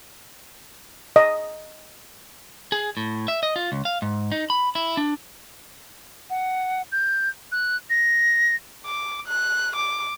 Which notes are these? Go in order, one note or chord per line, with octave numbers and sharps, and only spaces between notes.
D#5
G#4
A2
E5
D#5
F4
C#2
F5
G#2
D#4
B5
E4
D4
F#5
G6
F#6
A#6
D6
F#6
D6